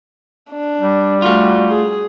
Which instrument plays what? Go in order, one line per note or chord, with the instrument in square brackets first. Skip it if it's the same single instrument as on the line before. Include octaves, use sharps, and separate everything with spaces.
[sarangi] D4
[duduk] G3
[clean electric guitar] A3 F4 [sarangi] F#4
[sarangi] G#4